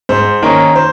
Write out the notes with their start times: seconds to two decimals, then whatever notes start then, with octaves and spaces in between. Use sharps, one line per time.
0.09 G#2 C5
0.42 D#3 A#3 C#4 A#4
0.76 C5